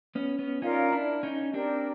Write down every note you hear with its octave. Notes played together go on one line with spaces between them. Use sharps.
B3 C#4
B3 C#4
C#4 D#4 F4 A#4 D5 F5
D4 E4
C#4 D#4
C4 D4 G4 A#4 D5